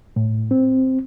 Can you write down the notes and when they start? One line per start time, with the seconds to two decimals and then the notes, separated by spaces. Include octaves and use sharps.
0.16 A2
0.51 C4